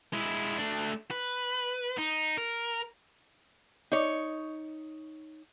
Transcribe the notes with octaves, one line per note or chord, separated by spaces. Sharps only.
G#3 E4
A3 D4
B4
D#4
A#4
D#4 C#5